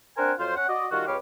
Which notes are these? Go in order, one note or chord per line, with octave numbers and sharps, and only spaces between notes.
C4 D4 A#4 C5 F#5 G#5
F2 F#3 F4 C5
C#4 F#5
F#4 D5 D#5
D#3 G3 F4 F#4
C#2 C#4 G4 B4 C#5 F5